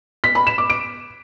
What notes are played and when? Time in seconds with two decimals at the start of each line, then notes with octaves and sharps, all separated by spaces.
0.24 B6
0.35 B5
0.47 E7
0.58 D6
0.70 D7